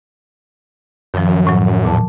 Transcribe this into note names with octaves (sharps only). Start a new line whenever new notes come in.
F#2 D#3 F3
A2 F#3
E2 A#2 A5